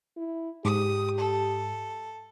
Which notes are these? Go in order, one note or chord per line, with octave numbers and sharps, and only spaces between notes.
E4
G#2 G4 D#6
A4